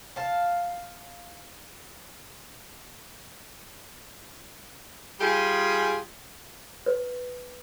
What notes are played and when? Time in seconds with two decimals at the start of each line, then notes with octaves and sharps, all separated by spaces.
0.16 F5 A5
5.20 G3 F4 G4 G#4
6.86 B4